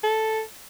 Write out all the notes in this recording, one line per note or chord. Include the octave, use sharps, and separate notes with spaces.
A4